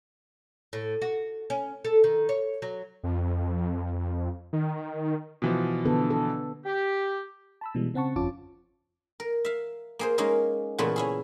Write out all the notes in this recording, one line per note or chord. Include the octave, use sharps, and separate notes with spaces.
A2
F#4
C#4
A4
D#3
C#5
F#3
F2
D#3
B2 E3 F3
D3 B3 A4
A4
G4
A5 B5 E6
B2 E3 G3 G#3
C#3 C4 F#5 A5 C#6
G1 F2 C#4 F4 A5 D6
A#4
E5 F5
A#3 G#4 C5
G#3 A#3 C#4 D#4 G#4 A#4
A#2 C#3 E3 A3 B3 F4
C#4 E4 G#4